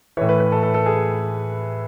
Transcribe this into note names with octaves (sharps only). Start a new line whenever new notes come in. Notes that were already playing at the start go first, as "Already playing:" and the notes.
A2 E3 C#5
B4
B4
A4
A4
A4
G#4